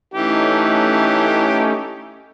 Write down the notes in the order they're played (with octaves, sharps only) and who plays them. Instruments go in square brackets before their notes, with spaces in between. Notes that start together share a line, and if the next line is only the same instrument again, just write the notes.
[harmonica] E3 G4 [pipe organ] A3 C#4 D#4